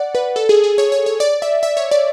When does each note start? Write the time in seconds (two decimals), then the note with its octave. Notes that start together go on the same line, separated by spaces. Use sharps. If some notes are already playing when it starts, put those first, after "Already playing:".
Already playing: D5 F#5
0.15 B4
0.36 A4
0.49 G#4
0.64 G#4
0.78 C#5
0.92 C#5
1.06 C#5
1.20 D5
1.42 E5
1.63 E5
1.77 C#5
1.91 D5